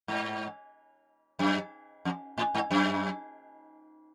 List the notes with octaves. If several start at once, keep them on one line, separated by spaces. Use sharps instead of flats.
G#2
F#2
F2
A2
G#2
F#2